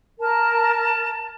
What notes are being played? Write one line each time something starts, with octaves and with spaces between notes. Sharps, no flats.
A#4 A5